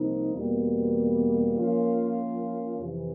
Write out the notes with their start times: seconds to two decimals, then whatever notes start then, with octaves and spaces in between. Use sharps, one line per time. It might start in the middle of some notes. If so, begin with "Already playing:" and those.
Already playing: C2 C3 F3 A#3 D#4
0.34 E2 B2 G3 A#3
1.57 F3 A#3 C#4 F4
2.79 F2 C3 E3